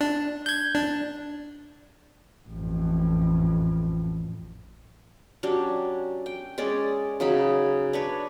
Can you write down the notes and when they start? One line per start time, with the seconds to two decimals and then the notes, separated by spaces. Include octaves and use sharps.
0.01 D4
0.46 G6 G#6
0.75 D4
2.49 A1 F2
5.43 F#3 C#4 D4 G4
6.26 G5
6.58 G#3 C#4 D5
7.20 C#3 F#3 D#4 B5
7.93 D4 B4 C#5